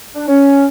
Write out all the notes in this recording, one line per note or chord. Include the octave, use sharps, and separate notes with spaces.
D4
C#4